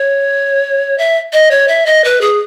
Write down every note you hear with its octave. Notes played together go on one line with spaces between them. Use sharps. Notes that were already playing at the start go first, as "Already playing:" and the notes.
Already playing: C#5
E5
D#5
C#5
E5
D#5
B4
G#4